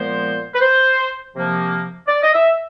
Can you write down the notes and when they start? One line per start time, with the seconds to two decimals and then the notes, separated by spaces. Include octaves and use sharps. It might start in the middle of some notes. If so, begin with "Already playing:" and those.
Already playing: A#2 F3 G#3 B3 C5
0.53 B4
0.60 C5
1.34 C3 F3 A#3
2.07 D5
2.22 D#5
2.32 E5